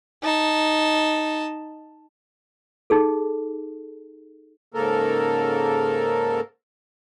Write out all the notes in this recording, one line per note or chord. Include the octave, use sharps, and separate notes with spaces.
D#4 A5
D#4 G#4 A4
G#2 C#3 A#3 A4 A#4